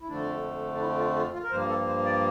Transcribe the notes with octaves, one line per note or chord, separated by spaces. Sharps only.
E4
F2 D3 F3 A3 D4
D4
E4
F4
F4
F4
A#4
G2 F3 A#3 C5
A4
C5
D5